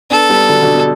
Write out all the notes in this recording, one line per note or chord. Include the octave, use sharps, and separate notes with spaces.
B3 D4 A4
G3 B3
D3 F#3
B2 D3
B2